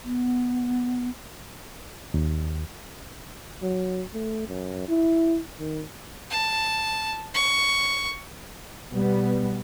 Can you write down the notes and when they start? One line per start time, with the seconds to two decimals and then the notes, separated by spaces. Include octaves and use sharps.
0.04 B3
2.14 D#2
3.62 F#3
4.14 A3
4.47 F#2
4.88 E4
5.59 D#3
6.30 A5
7.35 C#6
8.92 B2 G3 B3